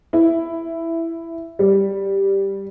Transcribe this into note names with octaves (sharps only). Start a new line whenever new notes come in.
E4
G3